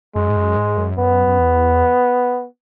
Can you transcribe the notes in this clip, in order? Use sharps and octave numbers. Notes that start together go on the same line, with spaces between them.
F#2 G#3
G#2
F#2
G#2
F#2
F#2 B3
F#2
E2